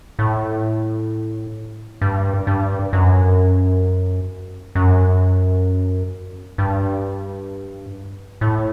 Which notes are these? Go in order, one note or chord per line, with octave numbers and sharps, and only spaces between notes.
A2
G2
G2
F#2
F#2
G2
A2